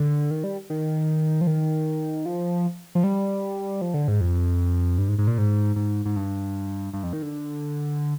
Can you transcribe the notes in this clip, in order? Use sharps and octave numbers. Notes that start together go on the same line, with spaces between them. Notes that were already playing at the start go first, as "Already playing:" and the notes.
Already playing: D3
D#3
G3
D#3
F3
D#3
F3
F3
G3
F3
D3
G#2
F2
G2
G#2
G#2
A#2
G#2
G#2
G#2
G2
G2
F2
D#3
D3